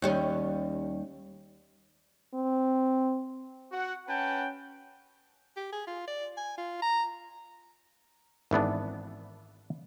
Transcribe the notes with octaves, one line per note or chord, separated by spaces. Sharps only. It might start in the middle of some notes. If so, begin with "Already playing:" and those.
D#2 G3 C#4
C4
F#4 F#5
C#4 B4 F#5 G5 A5
G4
G#4
F4
D5
G#5
F4
A#5
G#1 E3 B3 D4